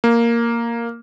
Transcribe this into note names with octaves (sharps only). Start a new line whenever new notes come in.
A#3